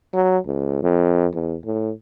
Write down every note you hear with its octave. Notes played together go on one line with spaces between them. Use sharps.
F#3
C#2
F2
E2
A2